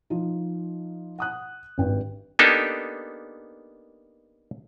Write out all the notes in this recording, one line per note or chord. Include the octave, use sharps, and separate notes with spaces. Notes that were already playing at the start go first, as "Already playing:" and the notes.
F3 D#4
F#5 D#6 F#6
G#1 G2 G5
A#3 B3 D4 D#4 G4 A4